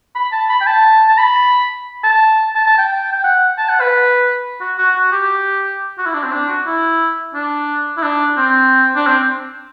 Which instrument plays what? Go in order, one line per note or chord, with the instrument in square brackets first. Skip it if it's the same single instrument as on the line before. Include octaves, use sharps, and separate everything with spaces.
[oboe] B5
A5
B5
G5
A5
A5
B5
A5
A5
A5
G5
G5
F#5
A5
F#5
B4
F#4
F#4
F#4
G4
F#4
E4
D4
C4
D4
F#4
E4
D4
E4
D4
C4
D4
C4